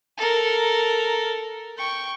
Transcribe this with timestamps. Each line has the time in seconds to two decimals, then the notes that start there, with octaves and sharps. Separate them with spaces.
0.17 A4 A#4
1.77 G5 C#6